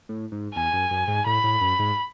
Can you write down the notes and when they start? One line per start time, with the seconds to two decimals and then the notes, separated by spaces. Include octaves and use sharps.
0.09 A2
0.32 G#2
0.55 E2 G#5
0.73 F#2
0.91 F#2
1.08 G#2
1.26 A2 B5
1.44 A2
1.61 F#2
1.79 G#2